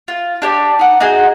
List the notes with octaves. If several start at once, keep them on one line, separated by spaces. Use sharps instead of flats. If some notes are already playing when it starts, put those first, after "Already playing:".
F4
D4 G4 D5
D#4 F#5
D#4 F#4 G#4 D#5